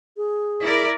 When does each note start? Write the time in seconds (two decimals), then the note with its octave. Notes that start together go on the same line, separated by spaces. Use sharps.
0.17 G#4
0.62 E4 A#4 D5